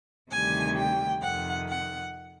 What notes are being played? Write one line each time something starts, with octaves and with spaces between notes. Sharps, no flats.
D2 C3 D#3 G3 G#5
G5
F2 C3 D#3 F#5
F#5